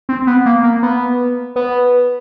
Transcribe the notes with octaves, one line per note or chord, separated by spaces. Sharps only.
C4
B3
A#3
A#3
B3
B3